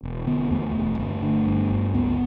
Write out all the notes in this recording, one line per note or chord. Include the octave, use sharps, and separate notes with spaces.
E1
D3 B3
E2 A3
E1
G1 A3
D3
G2
G1
C#2 B3